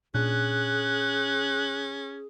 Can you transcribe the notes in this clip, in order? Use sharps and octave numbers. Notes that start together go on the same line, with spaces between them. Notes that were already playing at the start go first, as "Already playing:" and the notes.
A#2 C#4 D4 G#4 F#6